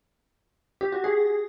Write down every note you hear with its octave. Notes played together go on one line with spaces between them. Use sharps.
G4
F#4
G#4